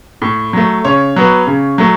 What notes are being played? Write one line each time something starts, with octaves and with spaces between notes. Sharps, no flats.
A2
F#3 A3
C#3 C#5
F#3 B3
C#3
F#3 A3